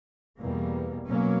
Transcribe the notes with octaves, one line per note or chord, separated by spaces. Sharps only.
E2 B2 G3 A#3
B2 F#3 A#3 C#4